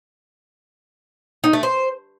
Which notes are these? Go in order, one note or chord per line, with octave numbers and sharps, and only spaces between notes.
D#4
A3
C5